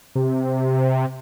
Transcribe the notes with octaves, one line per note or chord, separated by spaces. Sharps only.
C3